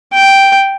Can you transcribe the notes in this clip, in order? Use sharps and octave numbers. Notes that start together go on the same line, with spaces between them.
G5